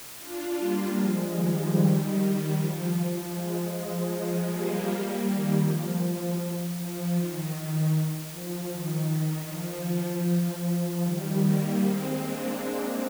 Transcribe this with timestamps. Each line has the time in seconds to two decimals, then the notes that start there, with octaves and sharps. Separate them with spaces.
0.18 D4 F4
0.58 G3 A#3
0.97 F3 G#3
1.34 D#3 G3
2.51 F3
3.28 F3 G#3
3.67 F3 G#3
4.06 F3 G#3
4.44 G3 A#3
5.22 D#3 G3
5.60 F3
6.77 F3
7.16 D#3
8.31 F3
8.71 D#3
9.48 F3
9.87 F3
11.02 D#3 G3
11.41 G3 A#3
11.80 G#3 C4
12.19 A#3 D4